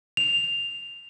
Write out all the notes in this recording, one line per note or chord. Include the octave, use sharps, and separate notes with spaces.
F7